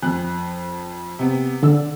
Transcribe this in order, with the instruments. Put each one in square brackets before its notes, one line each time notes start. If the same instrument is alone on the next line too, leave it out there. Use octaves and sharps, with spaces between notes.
[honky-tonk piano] F2 F#6
C3 B3
[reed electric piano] D3 [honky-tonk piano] D5 E6